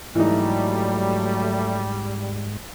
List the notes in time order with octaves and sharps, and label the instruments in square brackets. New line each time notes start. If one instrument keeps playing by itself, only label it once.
[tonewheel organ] G#2 [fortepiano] E3 D#4 [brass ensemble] F#3 A3 [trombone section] G3